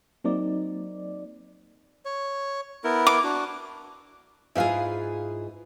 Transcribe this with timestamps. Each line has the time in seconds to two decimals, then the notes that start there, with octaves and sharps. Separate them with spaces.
0.24 F#3 A#3 C4 D#4 D5
2.05 C#5
2.84 B3 E4 A#4
3.07 D6
3.24 D4 F#4
4.55 G#2 E4 F4 G#4 B4 F5